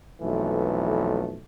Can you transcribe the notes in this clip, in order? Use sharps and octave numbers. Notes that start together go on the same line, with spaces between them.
B1 F2 E3 A3